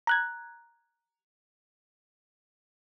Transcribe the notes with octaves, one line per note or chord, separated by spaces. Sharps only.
A#5 F#6 G#6